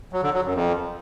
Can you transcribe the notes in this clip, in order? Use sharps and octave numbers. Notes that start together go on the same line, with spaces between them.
F#3
D3
F#3
F#2
F2